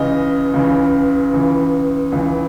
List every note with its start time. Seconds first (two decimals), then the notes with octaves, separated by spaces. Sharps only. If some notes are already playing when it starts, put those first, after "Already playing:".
Already playing: C#2 C#3 E3 D#5
0.53 C#2 C#3 E3
1.33 C#2 C#3 E3
2.12 C#2 C#3 E3